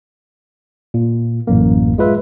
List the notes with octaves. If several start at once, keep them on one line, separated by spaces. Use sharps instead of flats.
A#2
A1 F#2 A#3
G#3 F4 B4 E5